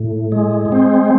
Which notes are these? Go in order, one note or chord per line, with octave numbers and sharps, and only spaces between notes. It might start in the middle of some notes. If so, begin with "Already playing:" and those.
Already playing: A2
G#3
C4